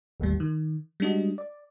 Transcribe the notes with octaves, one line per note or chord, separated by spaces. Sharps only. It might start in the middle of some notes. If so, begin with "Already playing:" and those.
G1 D#2 A2 G3
D#3
G3 G#3 D4 F#4 D#5
D5